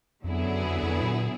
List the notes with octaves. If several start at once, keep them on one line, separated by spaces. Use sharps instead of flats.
F2 D3 F#3 B3 E4 G#4
F#2
F2
F2
A#2